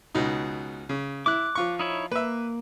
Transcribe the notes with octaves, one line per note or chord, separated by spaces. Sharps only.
C#2 B2 D#4
C#3
E4 D6 F#6
F3 F4 C#6
D#4 E4 C#5
A#3 B4 E5